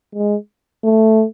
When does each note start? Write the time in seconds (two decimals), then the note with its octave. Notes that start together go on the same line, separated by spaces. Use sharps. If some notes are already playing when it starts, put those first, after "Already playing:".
0.15 G#3
0.84 A3